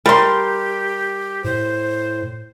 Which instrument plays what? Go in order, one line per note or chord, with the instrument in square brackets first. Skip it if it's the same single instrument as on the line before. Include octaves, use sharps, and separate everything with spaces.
[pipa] G3 C6 [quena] G4 [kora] A#4
[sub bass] A2 [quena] C5